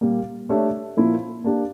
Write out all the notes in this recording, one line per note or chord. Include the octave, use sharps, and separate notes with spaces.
A#2 G3 A#3
A3 D4 G4 C#5 E5
A#2 F3 A#3 E4
A#3 D4 G4